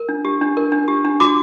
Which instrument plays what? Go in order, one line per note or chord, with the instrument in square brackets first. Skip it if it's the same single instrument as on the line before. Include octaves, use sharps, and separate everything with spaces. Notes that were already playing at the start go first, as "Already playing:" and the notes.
Already playing: [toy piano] A#4
D4
G4
D4
A#4
D4
G4
D4
F#4 D6